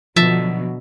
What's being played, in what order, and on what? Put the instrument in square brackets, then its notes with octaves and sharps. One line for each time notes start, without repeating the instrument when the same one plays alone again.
[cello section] B2 D3 F#3 [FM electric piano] F3 [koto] E5 A5